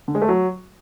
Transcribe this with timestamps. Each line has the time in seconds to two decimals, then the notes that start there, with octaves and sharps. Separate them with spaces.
0.08 D3
0.15 G#3
0.22 A3
0.29 F#3